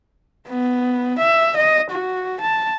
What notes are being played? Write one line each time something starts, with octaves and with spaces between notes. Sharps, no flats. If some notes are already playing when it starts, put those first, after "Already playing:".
B3
E5
D#5
F#4
A5